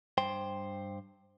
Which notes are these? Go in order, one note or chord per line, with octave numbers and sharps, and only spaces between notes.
G2 C5 G5 C6